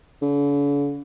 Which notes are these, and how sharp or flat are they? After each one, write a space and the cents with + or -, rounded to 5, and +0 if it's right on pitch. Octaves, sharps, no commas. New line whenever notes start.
D3 -45